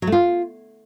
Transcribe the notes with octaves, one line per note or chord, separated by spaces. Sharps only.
F#3
A3
F4